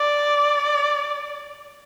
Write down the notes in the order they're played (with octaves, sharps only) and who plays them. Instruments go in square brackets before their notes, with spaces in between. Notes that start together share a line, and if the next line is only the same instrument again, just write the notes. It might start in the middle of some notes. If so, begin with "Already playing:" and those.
Already playing: [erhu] D5